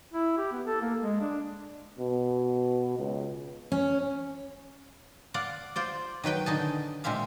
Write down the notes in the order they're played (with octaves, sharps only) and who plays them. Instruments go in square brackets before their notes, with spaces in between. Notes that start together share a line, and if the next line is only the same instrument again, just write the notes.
[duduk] E4
G4
B3
A4
A#3
G#3
D4
[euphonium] B2
C#2
[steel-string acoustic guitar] C#4
[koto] D5 F5 F#5
F4 C5 D5
D#3 F#3 B4 G5
D3 D#4 G#4 A5
A#2 G#3 C4 E5 F5